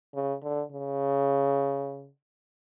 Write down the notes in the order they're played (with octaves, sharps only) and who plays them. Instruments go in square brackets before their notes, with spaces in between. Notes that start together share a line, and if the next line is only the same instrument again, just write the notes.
[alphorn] C#3
D3
C#3